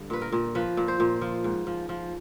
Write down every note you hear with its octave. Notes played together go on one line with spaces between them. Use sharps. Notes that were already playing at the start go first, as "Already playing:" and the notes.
Already playing: G2 D3
A#2 B4
A#4
A#2
F3 B4
A#2
C5
A#2
F3
G#2
F3
F3